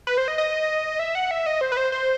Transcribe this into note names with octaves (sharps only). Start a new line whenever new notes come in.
B4
C5
D#5
D#5
E5
F#5
E5
D#5
C5
B4
C5
C5